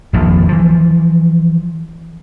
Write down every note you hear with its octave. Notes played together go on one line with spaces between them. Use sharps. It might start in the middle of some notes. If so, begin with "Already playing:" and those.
D#1 A#1 F2 F3
E3 F3